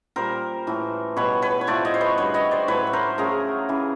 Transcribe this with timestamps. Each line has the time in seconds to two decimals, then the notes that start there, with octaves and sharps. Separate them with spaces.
0.16 A#2 G3 A#4 C5
0.67 A2 E3 A3
1.17 B2 G3 B4 C#5
1.42 B4 C#5
1.61 C#5
1.67 A2 F3 A3 C5 D5
1.85 C#5 D#5
1.94 C5
2.01 B4 C#5
2.18 D3 G3 B4 C#5
2.34 C#5 D#5
2.51 C5 D5
2.68 A2 F#3 A3 B4 C#5
2.87 C#5
2.93 A#4 C5
3.18 C#3 F#3 A3 G#4 A#4
3.69 C#3 E3 A3